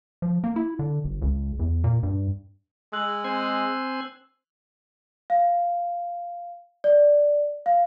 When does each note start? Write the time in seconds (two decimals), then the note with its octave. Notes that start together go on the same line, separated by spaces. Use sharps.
0.22 F3
0.44 A#3
0.56 E4
0.79 D3
1.05 G1
1.22 C#2
1.60 E2
1.84 A#2
2.03 G2
2.93 G#3 E6 F#6 F#7
3.24 C4 C5 G#5
5.30 F5
6.84 D5
7.66 F5